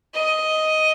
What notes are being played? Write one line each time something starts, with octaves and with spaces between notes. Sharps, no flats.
D#5